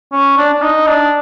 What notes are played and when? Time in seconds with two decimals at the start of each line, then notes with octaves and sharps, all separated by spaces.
0.12 C#4
0.38 D4
0.54 D4
0.62 D#4
0.87 D4